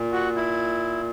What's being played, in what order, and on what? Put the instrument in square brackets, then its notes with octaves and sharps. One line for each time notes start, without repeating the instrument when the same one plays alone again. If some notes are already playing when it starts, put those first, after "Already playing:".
Already playing: [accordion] A#2
F#4
E4